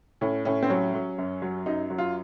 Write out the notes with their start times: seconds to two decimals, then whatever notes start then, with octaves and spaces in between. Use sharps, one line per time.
0.21 A2 C#4
0.45 A2 C#4
0.63 C4
0.70 F#3 C#4
0.94 F#3
1.18 F#2
1.42 F#3
1.66 F#2 D#4
1.90 F#3
1.98 F4